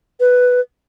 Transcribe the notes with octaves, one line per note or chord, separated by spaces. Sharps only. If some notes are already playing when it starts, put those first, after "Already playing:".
B4